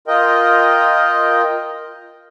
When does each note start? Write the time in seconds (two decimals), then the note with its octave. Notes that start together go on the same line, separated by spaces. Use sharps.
0.08 F4 A#4 D#5 G5